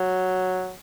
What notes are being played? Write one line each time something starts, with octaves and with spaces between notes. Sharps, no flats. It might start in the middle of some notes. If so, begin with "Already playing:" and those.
Already playing: F#3